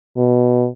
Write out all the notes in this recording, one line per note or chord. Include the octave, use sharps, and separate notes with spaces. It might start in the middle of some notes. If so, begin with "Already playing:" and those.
B2